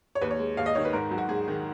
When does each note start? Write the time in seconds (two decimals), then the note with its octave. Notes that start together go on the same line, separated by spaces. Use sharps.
0.15 C#5
0.22 D#2 B4
0.31 C#5
0.39 G#3
0.57 D#2 F5
0.66 D#5
0.75 D#3 C#5
0.85 B4
0.93 G#2 A#4
1.11 F#3
1.18 F#4
1.29 G#2 G#4
1.48 D#3